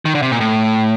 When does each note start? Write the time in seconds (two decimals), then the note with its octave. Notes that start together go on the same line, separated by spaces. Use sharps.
0.05 D#3
0.15 D3
0.22 C3
0.32 A#2
0.40 A2